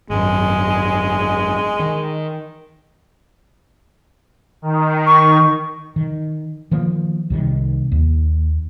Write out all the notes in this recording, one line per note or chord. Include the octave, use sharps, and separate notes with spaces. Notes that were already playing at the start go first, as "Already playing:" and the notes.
G#1 F#2 G#3
D#3
D#3
C#6
D#3
D#3 F3 A#3
C2 C3 D#3
D#2